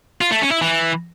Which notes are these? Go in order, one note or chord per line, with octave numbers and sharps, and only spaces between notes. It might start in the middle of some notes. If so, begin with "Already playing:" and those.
F4
A3
C#4
E4
E3